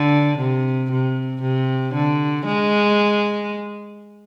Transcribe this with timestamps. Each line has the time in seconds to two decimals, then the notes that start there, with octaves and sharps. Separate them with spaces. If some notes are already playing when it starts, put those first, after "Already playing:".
Already playing: D3
0.38 C3
0.91 C3
1.42 C3
1.94 D3
2.46 G#3